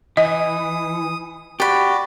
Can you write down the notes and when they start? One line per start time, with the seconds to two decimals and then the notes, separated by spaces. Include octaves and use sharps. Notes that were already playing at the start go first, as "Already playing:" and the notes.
0.17 E3 D#5 D#6
1.60 F#4 G4 D5 B5